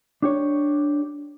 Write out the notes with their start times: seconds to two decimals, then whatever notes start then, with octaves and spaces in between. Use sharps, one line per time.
0.22 D4 G4 C#5